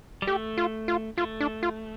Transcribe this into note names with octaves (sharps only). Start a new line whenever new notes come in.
G3
A3 G4
F4
F4
A3 F4
D4
F4